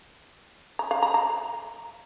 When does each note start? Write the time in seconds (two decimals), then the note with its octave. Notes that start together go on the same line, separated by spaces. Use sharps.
0.79 A#5
0.91 F5
1.03 A#5
1.14 A#5